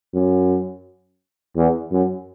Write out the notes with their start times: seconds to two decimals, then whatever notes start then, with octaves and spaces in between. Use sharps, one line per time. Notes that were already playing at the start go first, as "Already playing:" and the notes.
0.14 F#2
1.56 E2
1.92 F#2